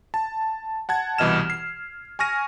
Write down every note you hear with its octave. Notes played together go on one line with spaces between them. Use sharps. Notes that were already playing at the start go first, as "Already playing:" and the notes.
A5
F#5 A5 G#6
C2 B2 E3 D#5 F6 E7
C7
G#5 C#6 F6 A#6 D#7